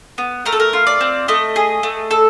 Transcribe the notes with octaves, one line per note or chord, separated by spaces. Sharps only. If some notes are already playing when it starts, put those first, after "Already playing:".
B3
A3 A#4
A4
A#4
F4
D5
C4
A3 D#5
G#4
A3
A4